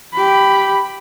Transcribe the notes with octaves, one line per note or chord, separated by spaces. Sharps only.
G4 B5